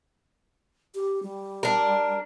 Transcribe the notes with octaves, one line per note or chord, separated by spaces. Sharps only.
G4
G3
D4 A#4